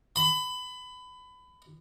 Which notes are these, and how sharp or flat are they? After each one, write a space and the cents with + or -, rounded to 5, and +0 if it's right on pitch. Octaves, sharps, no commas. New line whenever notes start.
B5 +25